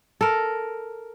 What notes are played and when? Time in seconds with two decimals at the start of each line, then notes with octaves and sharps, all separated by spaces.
0.21 A4 A#4